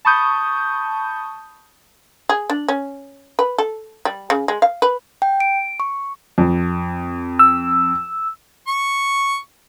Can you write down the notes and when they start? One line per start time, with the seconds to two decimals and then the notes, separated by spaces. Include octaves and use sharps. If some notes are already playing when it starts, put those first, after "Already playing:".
0.05 A5 B5 C#6 D#6 G6
2.29 G#4
2.50 D4
2.69 C#4
3.39 B4
3.58 A4
4.05 G3
4.30 C#3
4.48 G#3
4.62 F5
4.82 B4
5.22 G5
5.40 D7
5.80 C#6
6.38 F2
7.39 E6
8.67 C#6